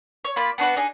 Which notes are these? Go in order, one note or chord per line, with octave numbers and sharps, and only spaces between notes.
C#5
A#3 F4 D5 B5
B3 D4 F#4 B4
D4 D#4 G#4